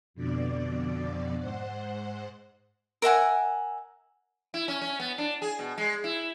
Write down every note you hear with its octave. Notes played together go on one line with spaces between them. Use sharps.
F2 B2 D3 D5
G#2 C5 F#5
A#4 E5 F#5 G#5
E4
C#4
C#4
B3
D4
G#4
B2
G#3
E4